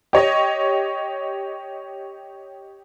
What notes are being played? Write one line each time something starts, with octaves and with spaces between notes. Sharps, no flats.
G4 C#5 D#5